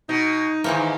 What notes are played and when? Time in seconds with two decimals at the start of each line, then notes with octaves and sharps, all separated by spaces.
0.09 B2 D#4
0.64 G#2 D#3 E3 A#3